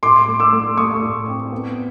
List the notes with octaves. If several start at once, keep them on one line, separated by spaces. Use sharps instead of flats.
A2 C6 D6
A3
D6 E6
A3
A3 C#6 D#6
A2
C4
B3